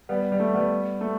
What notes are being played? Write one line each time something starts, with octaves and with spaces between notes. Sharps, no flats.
G3 B3
G3
A3
G3 B3
A3